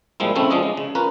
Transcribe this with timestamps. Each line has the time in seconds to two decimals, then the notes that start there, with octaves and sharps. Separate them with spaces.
0.20 A#2 F3 G3 G#3 E4
0.35 C#3 A3 C4 C#4 E4 A4
0.50 F3 G#3 C#4 D4 D#5
0.63 G#3
0.77 C#3
0.95 C#4 F4 A#4 B4